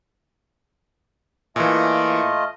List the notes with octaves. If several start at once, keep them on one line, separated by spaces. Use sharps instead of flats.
A#2 E3 A3 F4 D#5